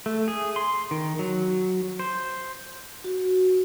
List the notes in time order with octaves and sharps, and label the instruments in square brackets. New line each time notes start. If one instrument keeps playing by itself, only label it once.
[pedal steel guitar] A3
G#4
C6
D#3
F#3
C5
[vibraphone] F#4